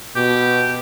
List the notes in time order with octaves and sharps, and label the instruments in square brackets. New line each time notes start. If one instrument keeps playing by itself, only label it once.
[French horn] B2 [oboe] G4